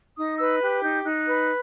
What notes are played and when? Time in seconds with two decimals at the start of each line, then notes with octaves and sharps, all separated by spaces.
0.17 D#4 D#6
0.38 B4 E6
0.61 G4 F#6
0.83 D#4 G6
1.05 D#4 F#6
1.27 B4